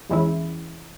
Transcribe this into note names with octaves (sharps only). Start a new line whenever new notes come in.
E2 E3 G#3 C#4 E4